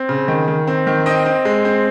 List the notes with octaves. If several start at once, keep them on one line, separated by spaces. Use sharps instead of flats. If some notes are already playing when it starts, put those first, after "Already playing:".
Already playing: C4
C#3
D#3
D#3
C4
D#3
C4 D#5 G5
C4
G#3
C4